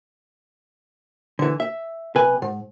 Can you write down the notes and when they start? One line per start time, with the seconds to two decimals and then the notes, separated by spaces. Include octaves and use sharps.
1.39 D3 E3
1.60 E5
2.15 B1 C3 B4 G#5
2.42 G#2